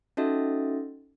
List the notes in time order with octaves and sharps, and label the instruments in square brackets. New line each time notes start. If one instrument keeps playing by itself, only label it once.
[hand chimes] C#4 D#4 F#4 A4 D#5 E5